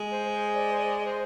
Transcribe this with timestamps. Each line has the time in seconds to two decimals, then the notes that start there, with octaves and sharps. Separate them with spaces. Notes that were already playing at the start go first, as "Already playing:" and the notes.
Already playing: G#3
0.12 C5
0.34 C5
0.55 D5
0.72 C5
0.77 D5
1.06 C5